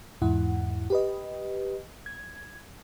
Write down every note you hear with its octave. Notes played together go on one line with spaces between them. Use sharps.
E2 G#2 E4 F#5
G4 B4 D#5
G#6